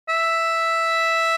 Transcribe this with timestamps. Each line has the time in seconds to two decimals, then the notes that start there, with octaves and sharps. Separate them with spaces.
0.09 E5